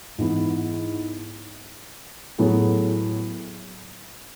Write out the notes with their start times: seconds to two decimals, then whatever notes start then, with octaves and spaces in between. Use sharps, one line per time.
0.18 G#2 E3 B3 E4
2.38 A2 F#3 B3 E4 G#4